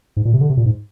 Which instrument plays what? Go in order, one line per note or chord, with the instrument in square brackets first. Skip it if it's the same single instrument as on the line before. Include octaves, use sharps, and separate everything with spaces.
[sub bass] G#2
A#2
C3
D3
C3
A#2
G#2